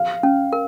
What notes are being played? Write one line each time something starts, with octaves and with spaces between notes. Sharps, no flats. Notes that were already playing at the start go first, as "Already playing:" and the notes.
Already playing: F5
C#4
A#4